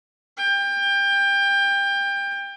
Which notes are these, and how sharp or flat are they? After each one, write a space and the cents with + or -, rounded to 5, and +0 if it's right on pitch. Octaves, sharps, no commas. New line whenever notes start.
G5 +25